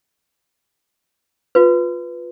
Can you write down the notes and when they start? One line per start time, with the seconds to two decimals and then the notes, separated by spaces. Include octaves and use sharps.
1.55 F4 B4